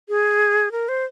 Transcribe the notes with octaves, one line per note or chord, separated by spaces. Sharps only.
G#4
A#4
C5